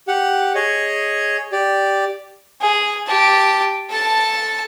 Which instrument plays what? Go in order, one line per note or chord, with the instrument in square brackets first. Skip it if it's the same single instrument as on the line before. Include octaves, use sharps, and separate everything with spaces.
[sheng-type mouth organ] G4 F#5
G#4 C#5 D#5
G4 D5
[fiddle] G#4
G4 A5
A4 A5